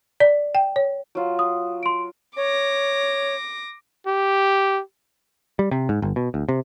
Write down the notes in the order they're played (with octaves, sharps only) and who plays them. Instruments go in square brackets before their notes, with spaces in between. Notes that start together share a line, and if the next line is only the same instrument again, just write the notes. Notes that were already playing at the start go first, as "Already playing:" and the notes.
[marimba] D5
G5
C#5
[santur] F#3 F4
[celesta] D#6
C6 D7
[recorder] C#5 [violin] D6 A#6
[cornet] G4
[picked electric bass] G3
C3
G#2
G1
B2
D2
C3